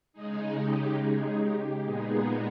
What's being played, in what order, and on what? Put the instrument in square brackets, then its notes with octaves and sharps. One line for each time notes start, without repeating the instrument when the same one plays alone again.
[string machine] C#3 G#3 D#4 G#4
G4
G#4
G4
A#2 G#3 B3 D#4 G#4